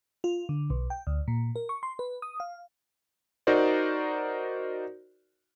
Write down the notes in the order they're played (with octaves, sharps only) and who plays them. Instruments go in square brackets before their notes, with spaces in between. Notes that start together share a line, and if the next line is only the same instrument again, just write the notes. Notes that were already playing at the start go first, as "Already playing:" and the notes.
[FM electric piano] F4
D3
B1
G5
D2
A#2
A#4
C#6
C6
B4
D#6
F5
[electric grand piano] D#4 F#4 A#4 C5 D5